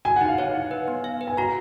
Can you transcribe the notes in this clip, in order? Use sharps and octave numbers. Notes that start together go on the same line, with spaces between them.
F#4 G#5
D#4 F#5
F5
C#5 F#5
D#4
B4
B3
F5
B4
G#5
F#4 A#5